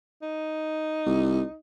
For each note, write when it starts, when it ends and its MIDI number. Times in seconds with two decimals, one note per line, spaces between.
0.22 1.55 63
1.06 1.42 36